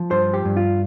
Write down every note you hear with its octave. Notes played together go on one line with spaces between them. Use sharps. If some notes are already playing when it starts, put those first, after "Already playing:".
Already playing: F3
G2 C5
G4
G2
F4